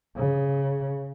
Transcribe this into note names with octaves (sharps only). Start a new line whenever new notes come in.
C#3